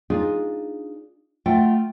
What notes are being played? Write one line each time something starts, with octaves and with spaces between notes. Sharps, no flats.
D4 D#4 F4 G#4
A3 F4 F#5 G5